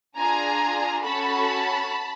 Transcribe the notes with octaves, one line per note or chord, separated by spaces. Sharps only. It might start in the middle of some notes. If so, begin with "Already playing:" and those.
D4 F4 G#4 G#5 A#5
C#4 F#4 A4 A5 B5